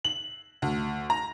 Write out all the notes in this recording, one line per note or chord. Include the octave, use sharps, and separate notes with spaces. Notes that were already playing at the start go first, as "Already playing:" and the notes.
F#7
D2
A#5